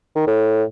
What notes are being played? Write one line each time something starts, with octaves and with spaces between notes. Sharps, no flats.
D#3
A2